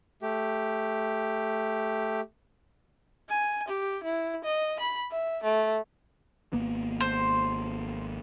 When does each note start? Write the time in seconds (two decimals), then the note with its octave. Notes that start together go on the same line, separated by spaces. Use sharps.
0.22 A3 G4
3.29 G#5
3.68 G4
4.03 E4
4.44 D#5
4.80 B5
5.11 E5
5.43 A3
6.53 G#1 A#3 B3
7.00 C5